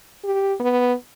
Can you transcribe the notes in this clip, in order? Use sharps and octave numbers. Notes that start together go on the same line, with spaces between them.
G4
B3